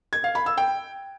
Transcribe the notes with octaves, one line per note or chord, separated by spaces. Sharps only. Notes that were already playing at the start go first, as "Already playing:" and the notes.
G#6
F5
B5
E6
G5